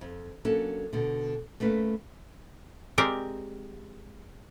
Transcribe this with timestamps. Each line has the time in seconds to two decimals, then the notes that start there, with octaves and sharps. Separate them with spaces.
0.01 F2
0.45 F#3 A#3 C#4 D4 A4
0.93 B2 D3
1.60 A3 A#3 C#4 B4
2.98 G#3 C4 G4 A#4 D5